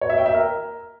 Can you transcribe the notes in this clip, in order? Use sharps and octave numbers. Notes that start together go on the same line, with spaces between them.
C#5
E5
G5
E5
A#4